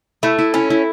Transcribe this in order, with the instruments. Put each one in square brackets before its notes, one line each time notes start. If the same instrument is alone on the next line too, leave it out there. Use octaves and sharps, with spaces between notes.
[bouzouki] A3 [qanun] E4
[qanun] E4
[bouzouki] C#4 [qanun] E4
[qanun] E4